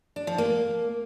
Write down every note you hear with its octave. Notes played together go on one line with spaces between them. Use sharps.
D4
F3
A#3